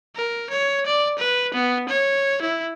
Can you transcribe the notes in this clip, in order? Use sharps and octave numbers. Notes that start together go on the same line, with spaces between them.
A#4
C#5
D5
B4
B3
C#5
E4